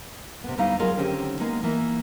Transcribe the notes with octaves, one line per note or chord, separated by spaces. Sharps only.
C3 B3
D2 G3 B3 D#4 E4 F5
F#3 G#3 F4 G#4 A#4 D#5
D3 D#3 C4 C#4 G4
G#3 A#3 B3 D#4
E3 A#3 E4